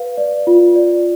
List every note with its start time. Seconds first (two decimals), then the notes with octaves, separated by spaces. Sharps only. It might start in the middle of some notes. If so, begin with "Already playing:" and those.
Already playing: B4 F5
0.17 D5
0.47 F4
0.76 D5